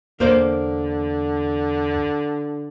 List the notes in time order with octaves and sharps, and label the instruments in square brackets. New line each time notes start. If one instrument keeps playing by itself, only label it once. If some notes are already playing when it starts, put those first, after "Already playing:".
[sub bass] E2 [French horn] D3 [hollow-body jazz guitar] A#3 C5 D5